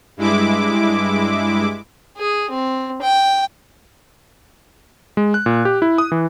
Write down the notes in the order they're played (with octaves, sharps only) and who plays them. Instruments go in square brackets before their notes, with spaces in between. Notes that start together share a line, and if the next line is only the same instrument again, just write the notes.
[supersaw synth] G2 G#3 E4 D6
[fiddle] G#4
C4
G5
[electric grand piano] G#3
F#6
A#2
G4
E4
D#6
E3